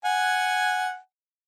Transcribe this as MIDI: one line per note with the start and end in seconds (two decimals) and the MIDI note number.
0.05 0.97 78
0.05 0.97 80